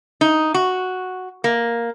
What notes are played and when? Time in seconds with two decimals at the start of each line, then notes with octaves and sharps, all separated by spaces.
0.21 D#4
0.54 F#4
1.44 A#3